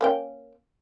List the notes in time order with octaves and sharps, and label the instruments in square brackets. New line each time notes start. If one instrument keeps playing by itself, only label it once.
[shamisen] A#3 C#4 G5